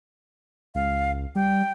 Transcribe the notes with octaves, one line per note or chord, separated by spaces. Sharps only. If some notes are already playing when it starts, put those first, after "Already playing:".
C#2 F5
G3 G5